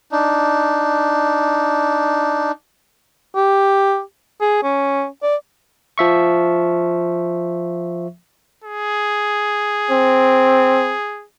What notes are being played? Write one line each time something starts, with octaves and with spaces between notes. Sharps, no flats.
D4 D#4
G4
G#4
C#4
D5
F3 E5 C#6
G#4
C4